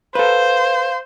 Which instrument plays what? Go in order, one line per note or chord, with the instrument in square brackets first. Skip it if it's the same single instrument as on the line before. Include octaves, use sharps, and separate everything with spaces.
[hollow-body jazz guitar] A4 B4 [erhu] C5 [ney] F5